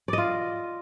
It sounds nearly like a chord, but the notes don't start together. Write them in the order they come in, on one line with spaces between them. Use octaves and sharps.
D5 D#5 F4